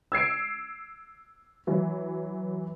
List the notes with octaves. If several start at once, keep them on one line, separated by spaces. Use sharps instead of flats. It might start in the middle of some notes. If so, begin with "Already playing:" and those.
E6 G#6 C7 D7
E3 F#3